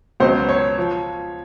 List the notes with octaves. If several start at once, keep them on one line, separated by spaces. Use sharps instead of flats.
C#2 B2 F#3 C5
C#5
F3